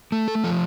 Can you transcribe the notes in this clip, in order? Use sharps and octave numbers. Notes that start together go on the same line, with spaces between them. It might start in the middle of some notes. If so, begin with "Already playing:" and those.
A3
A4
F3 A4